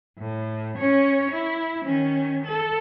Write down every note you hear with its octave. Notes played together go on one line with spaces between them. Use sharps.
A2
C#4 C#5
E4
D#3 C#4
A4